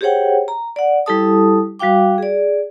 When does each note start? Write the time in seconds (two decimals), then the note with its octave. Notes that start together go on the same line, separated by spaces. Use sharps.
0.01 G4 G#4 C5 C#5 F#5 G5
0.48 A#5
0.76 D5 F#5
1.06 G3 E4 G4 A4 A5 D#6
1.79 G3 F#4 F5 G5 D6
2.18 G#4 D5